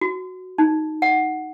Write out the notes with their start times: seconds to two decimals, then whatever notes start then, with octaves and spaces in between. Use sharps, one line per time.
0.01 F#4
0.58 D#4
1.02 F#5